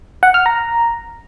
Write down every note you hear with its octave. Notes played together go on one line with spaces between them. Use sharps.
F#5
F6
A#5